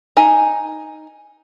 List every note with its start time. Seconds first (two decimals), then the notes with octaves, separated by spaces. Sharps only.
0.17 D#4 G#5